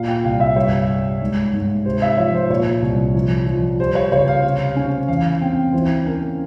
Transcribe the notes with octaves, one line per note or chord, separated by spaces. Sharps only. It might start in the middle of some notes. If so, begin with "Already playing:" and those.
Already playing: A#2 F5
G5
C2 F5
E5
G2 C#5
G4
G#2
G#2
C3 C5
E5
F3 C#5
C5
A#2 C#5
C2
F3
F3
G3 C5
C#5
C#3 C#5
F5
C3
C#4
E2 F5
C4 G5
E3 C5
C#4 A#4